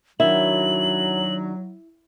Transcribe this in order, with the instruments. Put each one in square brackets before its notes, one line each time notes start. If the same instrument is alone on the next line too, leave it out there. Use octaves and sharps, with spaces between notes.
[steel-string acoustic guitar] D#3 D4 F#4 [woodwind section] F#3 [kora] E4 [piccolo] F#7